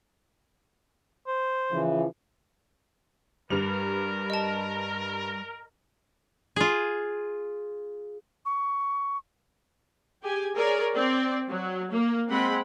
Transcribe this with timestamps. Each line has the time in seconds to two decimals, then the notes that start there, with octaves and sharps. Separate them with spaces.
1.27 C5
1.71 C#3 E3 F3
3.50 G2 G3 A#4 B4 F7
4.30 D#5 A5
6.56 F4 G#4
8.45 C#6
10.23 G4 G#4 G#5
10.55 G#4 A#4 C#5 D5
10.94 C4 D5
11.49 F#3
11.91 A#3
12.29 G#3 C4 F#5 B5